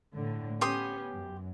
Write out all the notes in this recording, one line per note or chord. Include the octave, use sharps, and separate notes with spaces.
A2 D3
B3 C#4 G4 C6 D#6
F#2